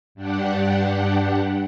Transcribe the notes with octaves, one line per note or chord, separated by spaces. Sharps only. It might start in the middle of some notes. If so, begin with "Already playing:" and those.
G2 D4 G4 F#5